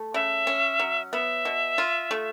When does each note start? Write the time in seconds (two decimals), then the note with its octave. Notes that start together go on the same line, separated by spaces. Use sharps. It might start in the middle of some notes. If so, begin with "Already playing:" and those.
Already playing: A3
0.14 C#3 E5
0.47 C#4
0.79 F#3
1.12 B3 E5
1.45 B2
1.78 F4
2.11 A3